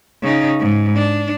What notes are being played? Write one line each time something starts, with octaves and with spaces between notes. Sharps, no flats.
C#3 D#4
G#2
D4